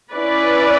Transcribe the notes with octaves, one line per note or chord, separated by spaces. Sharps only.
C#4 E4 B4 D5